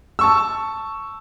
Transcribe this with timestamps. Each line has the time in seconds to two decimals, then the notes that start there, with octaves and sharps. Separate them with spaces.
0.19 A5 C#6 E6